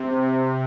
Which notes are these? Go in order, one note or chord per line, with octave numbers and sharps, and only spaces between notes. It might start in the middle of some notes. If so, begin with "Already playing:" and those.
Already playing: C3